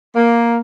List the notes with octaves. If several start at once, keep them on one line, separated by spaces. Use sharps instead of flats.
A#3